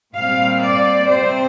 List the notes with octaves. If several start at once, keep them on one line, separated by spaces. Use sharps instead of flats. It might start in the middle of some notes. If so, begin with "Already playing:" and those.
A#2 G3 C4 F5
D5
C3 G3 C4 C5